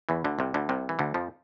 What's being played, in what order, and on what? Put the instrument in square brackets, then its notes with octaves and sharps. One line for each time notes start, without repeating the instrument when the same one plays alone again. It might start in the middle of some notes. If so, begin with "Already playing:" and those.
[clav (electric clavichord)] E2 E3
D2 D3
C2 C3
D2 D3
C2 C3
E3
D2 D3
F2 F3